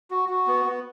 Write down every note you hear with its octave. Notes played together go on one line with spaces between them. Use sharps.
F#4
F#4
B3
B3